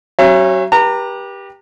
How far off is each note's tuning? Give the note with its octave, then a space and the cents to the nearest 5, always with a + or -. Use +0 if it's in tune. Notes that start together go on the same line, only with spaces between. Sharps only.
F#3 +35 C#4 -25 E5 +35
G4 +10 B4 -40 A#5 -30